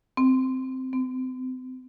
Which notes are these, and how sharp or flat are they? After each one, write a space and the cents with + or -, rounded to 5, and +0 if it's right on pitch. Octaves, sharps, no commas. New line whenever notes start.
C4 -10
C4 -35